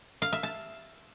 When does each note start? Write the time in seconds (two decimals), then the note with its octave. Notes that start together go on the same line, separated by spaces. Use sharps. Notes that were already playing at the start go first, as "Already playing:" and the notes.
0.22 F5
0.33 E5
0.43 A5